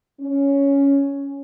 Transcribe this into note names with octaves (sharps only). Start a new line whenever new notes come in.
C#4